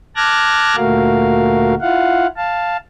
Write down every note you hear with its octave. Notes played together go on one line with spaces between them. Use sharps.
A5 D6 F6 F#6 G#6 A#6
D2 A#2 A3 F#4 A#4 F5
E4 F4 F5 F#5
F5 A5